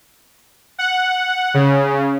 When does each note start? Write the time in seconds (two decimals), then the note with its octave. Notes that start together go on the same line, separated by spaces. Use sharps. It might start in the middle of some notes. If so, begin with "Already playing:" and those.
0.79 F#5
1.54 C#3